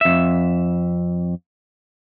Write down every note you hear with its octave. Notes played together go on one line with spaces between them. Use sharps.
F2 E5